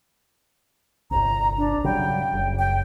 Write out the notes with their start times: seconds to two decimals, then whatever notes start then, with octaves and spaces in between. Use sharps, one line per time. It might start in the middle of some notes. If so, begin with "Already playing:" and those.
1.11 G1 C2 A#5
1.57 D4
1.84 C#3 F#3 G3 G5
2.33 F#1
2.59 G5